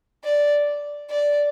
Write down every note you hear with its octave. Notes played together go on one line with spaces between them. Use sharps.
D5
D5